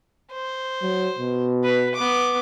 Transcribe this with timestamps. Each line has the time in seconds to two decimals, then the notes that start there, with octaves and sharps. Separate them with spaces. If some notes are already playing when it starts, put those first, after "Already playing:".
0.31 C5
0.82 F#3
1.19 B2
1.63 B4
1.94 B3 D6